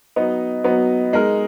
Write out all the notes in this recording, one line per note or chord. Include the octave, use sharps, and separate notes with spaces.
F#3 B3 D#4
F#3 B3 D#4
G#3 D#4 A#4